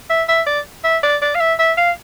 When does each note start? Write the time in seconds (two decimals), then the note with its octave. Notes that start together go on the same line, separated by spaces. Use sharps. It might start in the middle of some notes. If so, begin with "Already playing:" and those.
0.10 E5
0.29 E5
0.46 D5
0.84 E5
1.03 D5
1.22 D5
1.35 F5
1.40 E5
1.59 E5
1.78 F5